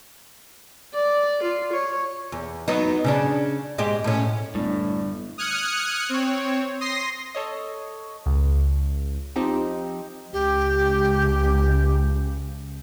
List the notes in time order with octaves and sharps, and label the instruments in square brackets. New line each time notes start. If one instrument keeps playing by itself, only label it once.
[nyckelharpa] D5
F4
C#5
[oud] E2
F#3 B3 D#4
C#3 C#4 D4
G#2 G#3 G4
A2 C#4
[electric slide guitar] A2 [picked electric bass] G3 B3 [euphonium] D4
[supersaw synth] D#6 F6 F#6 G#6 C#7
C4 C#5
C6 D#6 A#6 C7
[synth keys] A4 C#5 D#5
C#2
F3 C4 D#4 G4
[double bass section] C#2 [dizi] G4